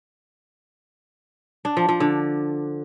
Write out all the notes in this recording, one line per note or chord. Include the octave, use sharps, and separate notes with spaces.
D4
F3
F3
D3